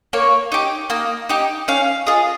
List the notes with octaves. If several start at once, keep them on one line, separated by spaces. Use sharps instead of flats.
A#3 C#5
D#4 G4
A#3 D#5
D#4 G4
C#4 F5
F4 G#4 D#5